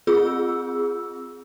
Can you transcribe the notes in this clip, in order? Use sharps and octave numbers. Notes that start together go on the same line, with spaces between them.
C4 F4 G#4 E6